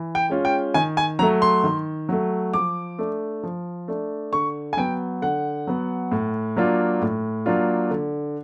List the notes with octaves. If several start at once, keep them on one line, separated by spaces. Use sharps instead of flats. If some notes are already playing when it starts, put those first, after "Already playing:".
Already playing: E3
G5
G#3 C#4 F4
G5
D#3 G#5
G#5
F#3 A3 A#5
C6
D#3
F#3 A3
F3 D6
A3 D4
F3
A3 D4
D3 C#6
G#5
F#3 B3 G5
D3 F#5
F#3 B3
A2
F#3 A#3 D4 F4
A2
F#3 A#3 D4 F4
D3